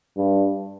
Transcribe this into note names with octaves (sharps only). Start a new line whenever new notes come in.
G2